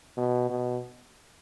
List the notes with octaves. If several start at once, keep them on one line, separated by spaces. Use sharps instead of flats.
B2
B2